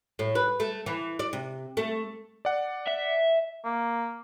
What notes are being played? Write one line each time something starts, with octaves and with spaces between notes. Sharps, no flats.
A2
B4
A3
E3
D5
C3
A3
D5 F#5
E5
A#3